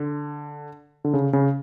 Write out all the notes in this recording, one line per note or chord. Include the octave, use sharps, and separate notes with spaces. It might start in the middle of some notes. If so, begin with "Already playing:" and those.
Already playing: D3
D3
C#3
C#3